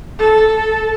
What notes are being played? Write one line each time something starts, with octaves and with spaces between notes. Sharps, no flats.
A4